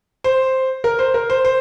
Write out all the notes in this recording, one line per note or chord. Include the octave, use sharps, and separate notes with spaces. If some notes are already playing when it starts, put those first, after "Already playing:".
C5
A#4
C5
A#4
C5
C5